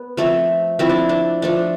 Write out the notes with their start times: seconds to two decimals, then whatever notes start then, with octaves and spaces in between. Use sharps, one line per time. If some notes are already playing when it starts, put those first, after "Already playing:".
Already playing: B3
0.17 F3 A3 C4
0.79 F3 A3 C4 E4
0.89 D4
1.09 D4
1.42 F3 A3 D4